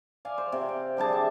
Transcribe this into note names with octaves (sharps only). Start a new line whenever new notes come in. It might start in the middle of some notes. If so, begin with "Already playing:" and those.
D5 F5 G#5
C5
C3
G5
D3 G3 G#4 A5
E5